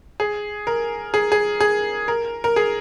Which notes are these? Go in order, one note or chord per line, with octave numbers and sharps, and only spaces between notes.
G#4
A#4
G#4
G#4
G#4
A#4
A#4
G#4